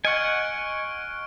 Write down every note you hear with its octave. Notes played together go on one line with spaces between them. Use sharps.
D#5 F#5 G#5 C#6 F6 G#6 C#7 D7